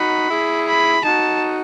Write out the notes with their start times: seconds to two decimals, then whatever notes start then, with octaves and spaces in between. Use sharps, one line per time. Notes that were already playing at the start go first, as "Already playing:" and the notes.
Already playing: D#4 F#4 B5
0.30 E4 G#4
0.68 B5
1.05 D#4 F#4 A5